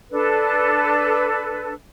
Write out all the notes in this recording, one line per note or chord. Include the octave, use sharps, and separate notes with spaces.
D4 A4 B4